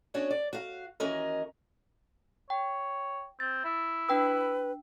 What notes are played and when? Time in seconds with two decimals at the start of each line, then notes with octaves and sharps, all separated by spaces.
0.14 B3 C#4 D4 F#4 C#5
0.30 D5
0.53 F#4 F5
1.00 D#2 E3 C#4 F#4 A#4 D#5
2.50 C#5 G5
3.40 C4 A6
3.65 E4
4.09 D4 B4 G5 E6